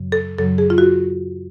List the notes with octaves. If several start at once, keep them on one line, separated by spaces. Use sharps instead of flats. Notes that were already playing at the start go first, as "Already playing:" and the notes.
Already playing: F#2 C#3 F#3
A4
F#2 C#3 F#3 A4
G#4
F4
F#4